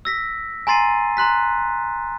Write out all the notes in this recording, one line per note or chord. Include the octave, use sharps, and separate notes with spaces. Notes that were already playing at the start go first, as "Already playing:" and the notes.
E6 A#6 B6
G#5 A#5 C6 A6 C7 D#7
A#5 C6 F#6 B6